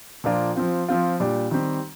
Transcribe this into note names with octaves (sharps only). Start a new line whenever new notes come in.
A#2 F3 A#3 D4 F4
F3 C4 F4
F3 C4 F4
A#2 G3 D4 G4
D#3 G3 C4 G4